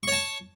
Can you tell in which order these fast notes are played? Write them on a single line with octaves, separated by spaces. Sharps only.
C#6 C#5 A5